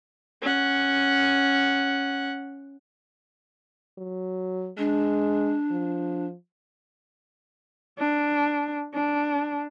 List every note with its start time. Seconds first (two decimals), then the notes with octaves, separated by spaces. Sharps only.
0.42 C#4 F#5
3.98 F#3
4.78 G#3 D4
5.71 F3
7.99 D4
8.94 D4